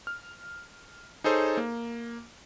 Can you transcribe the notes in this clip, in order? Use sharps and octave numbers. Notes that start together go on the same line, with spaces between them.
F6
D#4 G#4 A4 C5 C#5
A#3